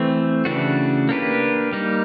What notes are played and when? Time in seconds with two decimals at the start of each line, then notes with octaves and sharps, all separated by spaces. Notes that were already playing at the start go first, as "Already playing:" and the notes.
Already playing: E3 A3 C4
0.45 C#3 E3 A3 D4 F#4
1.09 A#3 D4 G4 B4
1.73 G3 A#3 D#4